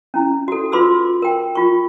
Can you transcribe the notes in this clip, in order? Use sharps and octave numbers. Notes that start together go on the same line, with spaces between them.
C#4 E4
F#4 A4
F4 B4 C6 D6 E6
A#4 G5
F4 C#6